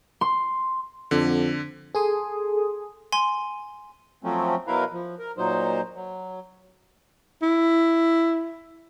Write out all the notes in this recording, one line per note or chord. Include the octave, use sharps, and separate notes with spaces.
C6
F2 D3
G#4 A4 G#5 C6 D#6
G#5 C6
F3 F#3 A3 C4 C#4
B2 F#3 E4 A#4 B4 F5
F3
A#4
A#2 F#3 D#4 C5
F#3
E4